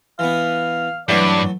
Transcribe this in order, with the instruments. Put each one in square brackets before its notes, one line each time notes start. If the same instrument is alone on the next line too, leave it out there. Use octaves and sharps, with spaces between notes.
[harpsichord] E3 B3 [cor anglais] F5
[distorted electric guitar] G2 [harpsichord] E3 F#3 A3 [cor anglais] D5